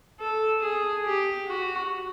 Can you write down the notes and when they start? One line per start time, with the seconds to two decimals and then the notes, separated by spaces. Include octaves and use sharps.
0.20 A4
0.62 G#4
1.05 G4
1.48 F#4